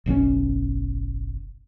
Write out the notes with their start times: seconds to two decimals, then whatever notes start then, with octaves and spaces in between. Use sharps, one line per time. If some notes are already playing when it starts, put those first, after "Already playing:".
0.06 F#1 B1 C#3 C#4